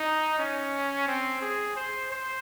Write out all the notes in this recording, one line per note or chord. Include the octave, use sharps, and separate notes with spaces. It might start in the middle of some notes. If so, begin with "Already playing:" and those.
Already playing: D#4
C#4
C4
G#4
C5
C5